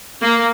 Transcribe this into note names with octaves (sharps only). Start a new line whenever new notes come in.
A#3